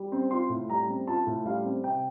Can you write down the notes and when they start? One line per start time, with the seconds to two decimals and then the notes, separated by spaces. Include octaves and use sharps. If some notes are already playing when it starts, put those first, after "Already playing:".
Already playing: G3
0.12 C4
0.31 F4 C6
0.49 A2
0.69 G3 A#5
0.89 C4
1.07 F4 A5
1.27 A2
1.45 G3 F5
1.64 C4
1.84 C3 G5